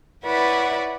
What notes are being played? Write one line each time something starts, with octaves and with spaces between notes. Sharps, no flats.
E4 B4 C#5 D5 E5 F#5